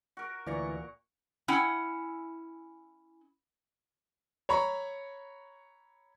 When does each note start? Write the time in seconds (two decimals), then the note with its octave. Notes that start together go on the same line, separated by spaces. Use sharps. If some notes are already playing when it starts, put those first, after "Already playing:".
0.17 F#4 A#4
0.46 D2 A#2 E3 D5 A#5 C#6
1.48 C#4 E4 F#5 G5
4.49 C#5 A#5 B5 C#6